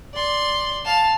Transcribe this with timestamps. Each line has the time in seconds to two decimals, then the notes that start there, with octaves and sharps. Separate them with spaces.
0.14 D5 C6
0.85 F5 A5